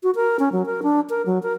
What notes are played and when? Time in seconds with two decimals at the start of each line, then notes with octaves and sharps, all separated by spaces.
0.03 F#4
0.15 A#4
0.39 C#4
0.52 F#3
0.66 A#4
0.83 D4
1.10 A#4
1.26 F#3
1.43 A#4